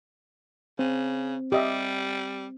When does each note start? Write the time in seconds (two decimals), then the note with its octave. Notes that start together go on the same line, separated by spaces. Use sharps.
0.79 C#3 C4
1.52 G3 G4 D#5 E5